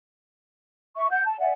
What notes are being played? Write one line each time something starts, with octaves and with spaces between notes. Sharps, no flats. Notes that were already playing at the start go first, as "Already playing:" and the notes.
E5 C#6
F#5 G6
A5
D5 E5 F#5 G#5